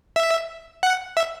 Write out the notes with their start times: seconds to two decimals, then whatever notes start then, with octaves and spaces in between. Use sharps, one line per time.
0.16 E5
0.83 F#5
1.17 E5